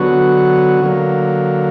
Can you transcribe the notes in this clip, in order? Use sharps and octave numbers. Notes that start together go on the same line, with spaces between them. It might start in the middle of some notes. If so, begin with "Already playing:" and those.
Already playing: D3 F#3 B3 F#4
D3 F#3 A#3